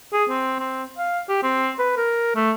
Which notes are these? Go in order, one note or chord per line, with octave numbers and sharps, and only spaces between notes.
G#4
C4
C4
F5
G4
C4
B4
A#4
A3